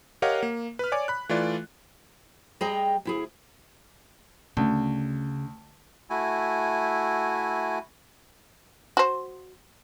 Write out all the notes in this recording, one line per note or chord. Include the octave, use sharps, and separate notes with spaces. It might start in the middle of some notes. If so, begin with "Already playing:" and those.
G4 A#4 C#5 D#5 F5 F#5
A#3
B4 F6
C#5 D5 G#5 D6
B5 F#6
E3 A3 F4 D5
G3 G#4 D#5 G5 A#5
D2 E4 G#4
D2 C#3
A3 E4 F#4 G#5
F#4 C5